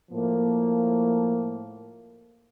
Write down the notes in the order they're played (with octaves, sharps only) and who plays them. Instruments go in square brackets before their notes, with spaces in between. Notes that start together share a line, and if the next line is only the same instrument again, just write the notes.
[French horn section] A2 F3 A#3